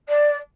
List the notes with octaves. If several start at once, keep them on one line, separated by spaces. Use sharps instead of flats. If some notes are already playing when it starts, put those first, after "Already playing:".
D5